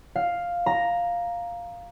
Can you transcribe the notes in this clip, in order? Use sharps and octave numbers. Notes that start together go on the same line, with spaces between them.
F5
A#5